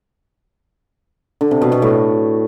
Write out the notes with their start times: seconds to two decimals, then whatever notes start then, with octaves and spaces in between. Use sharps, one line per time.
1.41 D3
1.51 C3
1.61 B2
1.72 B2
1.82 A2